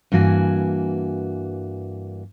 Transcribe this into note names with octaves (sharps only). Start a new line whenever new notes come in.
G2 E3 A#3 F#4 G#5